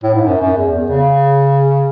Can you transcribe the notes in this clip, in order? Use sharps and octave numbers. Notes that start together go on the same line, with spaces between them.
A2
G#2
F#2
F#2
E2
E2
C#3